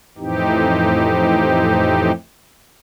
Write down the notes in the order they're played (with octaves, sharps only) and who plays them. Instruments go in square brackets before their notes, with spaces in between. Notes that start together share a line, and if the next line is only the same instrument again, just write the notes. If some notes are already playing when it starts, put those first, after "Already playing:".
[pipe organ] F2 A2 E3 C4 D#4 G4